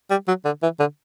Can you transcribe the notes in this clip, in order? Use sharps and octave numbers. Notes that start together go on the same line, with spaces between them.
G3
F#3
D3
E3
D3